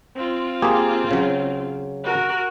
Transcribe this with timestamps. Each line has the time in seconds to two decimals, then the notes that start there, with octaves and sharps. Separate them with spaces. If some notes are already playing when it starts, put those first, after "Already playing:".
0.16 C4 F4
0.62 A#3 G4 G#4
1.11 C#3 F#3
2.03 F#4 A#4